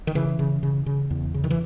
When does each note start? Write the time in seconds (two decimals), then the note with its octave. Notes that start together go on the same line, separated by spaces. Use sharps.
0.07 D#3
0.15 C#3 E3
0.39 C#3
0.63 C#3
0.86 C#3
1.11 E2
1.34 C#3
1.44 D#3
1.50 E3